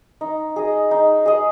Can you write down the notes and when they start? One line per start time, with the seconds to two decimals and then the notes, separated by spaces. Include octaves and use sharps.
0.21 D#4
0.56 G#4 D#5
0.91 D#4
1.26 G#4 D#5